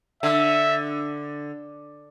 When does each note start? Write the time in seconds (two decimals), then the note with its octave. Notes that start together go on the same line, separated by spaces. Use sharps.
0.23 D3 E5